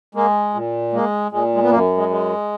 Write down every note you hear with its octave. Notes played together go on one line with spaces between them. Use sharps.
G#3 A#3
A#2
G#3 A#3
A#2 G#3
G#3
B3
F#2 A#3
G#3
G#3